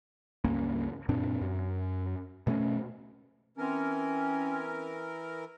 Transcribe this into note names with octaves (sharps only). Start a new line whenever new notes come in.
C#2 G2 A#3 C#4
F#2 A#2 C4 D4
F#2
B2 A3 B3 C#4
E3 C4 C#4 A#4